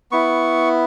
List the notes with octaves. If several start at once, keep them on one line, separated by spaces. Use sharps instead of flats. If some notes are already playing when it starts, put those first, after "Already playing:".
B3 E4 C#6